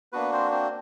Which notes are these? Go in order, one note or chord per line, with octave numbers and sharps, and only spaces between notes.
A#3 B3 D4 F#4 B4
C4 C5
C4 C5